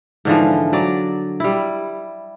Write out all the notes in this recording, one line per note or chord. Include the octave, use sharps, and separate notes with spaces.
G#2 D3 E3 F3
F#3 D5
G3 E4